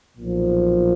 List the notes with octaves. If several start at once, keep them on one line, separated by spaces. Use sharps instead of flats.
B1 A#2 F3